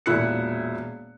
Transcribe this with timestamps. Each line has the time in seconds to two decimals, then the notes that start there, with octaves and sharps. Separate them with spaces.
0.06 E1 A#2 E4 F#6 C#7